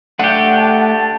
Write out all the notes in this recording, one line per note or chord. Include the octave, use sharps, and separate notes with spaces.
A3 D4 G4 F#5
A5